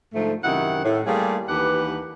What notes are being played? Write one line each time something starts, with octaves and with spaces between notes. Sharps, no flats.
G#2 D3 F3 A3
F#2 C3 D#3 E4 F#5
A2
G3 A3 A#3 F4 G#4
D#2 E3 D4 G4 B4 F#5